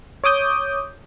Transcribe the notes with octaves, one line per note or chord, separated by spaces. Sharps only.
C#5 D6 D#6 G6